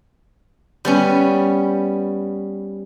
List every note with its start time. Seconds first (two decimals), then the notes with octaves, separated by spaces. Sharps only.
0.85 G3 B3 C#4